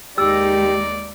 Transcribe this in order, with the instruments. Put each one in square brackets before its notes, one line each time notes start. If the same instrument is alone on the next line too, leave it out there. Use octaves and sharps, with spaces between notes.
[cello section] D#2 G#3 D#4 [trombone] G4 [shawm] D5 [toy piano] E6